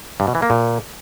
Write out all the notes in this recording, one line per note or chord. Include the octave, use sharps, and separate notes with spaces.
G2
B2
E3
A#3
A#2